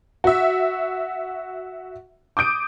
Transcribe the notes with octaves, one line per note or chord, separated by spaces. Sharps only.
F#4 E5
D6 D#6 G6 D7